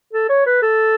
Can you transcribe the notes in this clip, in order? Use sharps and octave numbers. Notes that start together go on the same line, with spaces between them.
A4
C#5
B4
A4